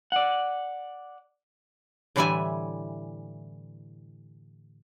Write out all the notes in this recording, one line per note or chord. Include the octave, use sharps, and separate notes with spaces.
D5 F#5
A2 D3 E3 G3 E5 G#5